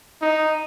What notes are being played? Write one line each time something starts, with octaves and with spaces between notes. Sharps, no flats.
D#4